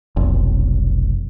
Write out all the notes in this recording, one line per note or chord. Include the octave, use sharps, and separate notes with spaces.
F1 B1